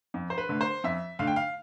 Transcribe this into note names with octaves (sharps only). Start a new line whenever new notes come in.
F2
C5
B4
D3 A3
C5
F2 E5
D3 A3 F5
G5
F5